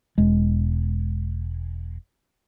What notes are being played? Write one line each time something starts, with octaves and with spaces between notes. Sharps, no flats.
E1 G#3